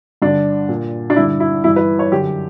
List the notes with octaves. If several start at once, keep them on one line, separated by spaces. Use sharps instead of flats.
G2 D3 D4
A#2
D4
G2 D3 E4
E4
G2 E3 E4
B4
C#5
F#2 D3 G4